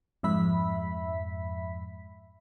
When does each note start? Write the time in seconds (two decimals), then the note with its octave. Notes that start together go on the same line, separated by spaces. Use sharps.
0.23 F2 G#2 E5 B5 B6